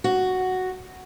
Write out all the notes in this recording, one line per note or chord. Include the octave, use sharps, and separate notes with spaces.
F#4